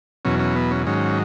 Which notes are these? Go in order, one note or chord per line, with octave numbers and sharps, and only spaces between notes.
E2 B2 F#3 C#4
C#4
B3
C#4
G#2 D#3 F#3 C#4